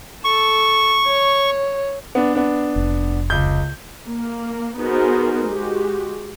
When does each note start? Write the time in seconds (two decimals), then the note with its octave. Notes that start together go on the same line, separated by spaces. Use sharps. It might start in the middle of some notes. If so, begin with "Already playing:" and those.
0.24 A4 C#6
1.07 C#5
2.15 B3 D4
2.35 B3 D4
2.76 F1
3.30 C#2 G6
4.05 A#3
4.78 B3 D#4 F#4 G#4 A#4 C5
5.48 G#3 F#4 G4